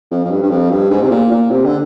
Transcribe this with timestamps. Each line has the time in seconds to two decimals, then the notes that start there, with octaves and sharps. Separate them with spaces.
0.11 F2
0.25 F2
0.31 G2
0.42 G2
0.50 F2
0.70 G2
0.91 G#2
1.01 C3
1.10 A#2
1.31 A#2
1.50 C3
1.65 D3